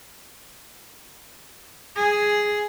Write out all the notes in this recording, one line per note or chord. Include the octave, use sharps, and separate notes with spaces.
G#4